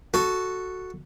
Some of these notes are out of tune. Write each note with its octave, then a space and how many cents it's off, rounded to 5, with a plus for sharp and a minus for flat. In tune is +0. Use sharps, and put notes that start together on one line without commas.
F#4 +0 A4 +0